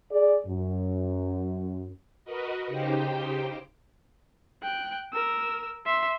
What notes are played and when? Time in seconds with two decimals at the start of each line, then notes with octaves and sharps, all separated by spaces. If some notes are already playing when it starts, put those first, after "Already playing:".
0.10 G#4 D5
0.46 F#2
2.25 F#4 A#4 B4 D#5
2.67 C#3 D#4 G4 C5 G5
4.63 G5 F#6
5.13 A#4 E6
5.86 E5 C6